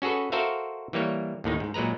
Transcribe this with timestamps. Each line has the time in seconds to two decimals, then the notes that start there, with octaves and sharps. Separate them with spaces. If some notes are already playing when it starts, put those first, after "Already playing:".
0.02 C#4 F#4 G#4 A4 B4
0.32 F#4 A4 A#4 C5 E5 F5
0.93 E3 G3 A#3 C#5
1.44 D#2 A2 D#3 D#4
1.60 G#2
1.74 A#2 F#3 G#3 B4 A#5